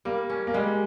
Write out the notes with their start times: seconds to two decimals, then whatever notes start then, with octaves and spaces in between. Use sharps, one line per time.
0.05 G3 A#3
0.30 C#4
0.47 A#3
0.54 G3 G#3